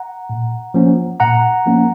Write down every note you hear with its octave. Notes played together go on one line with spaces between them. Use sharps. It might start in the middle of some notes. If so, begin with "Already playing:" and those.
Already playing: F#5 A#5
A#2
F3 A#3 C#4
A#2 F#5 A#5
F3 A#3 C#4